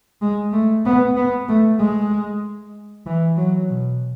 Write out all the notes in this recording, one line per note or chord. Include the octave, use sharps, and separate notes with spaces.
G#3
A3
B3
B3
A3
G#3
E3
F#3
B2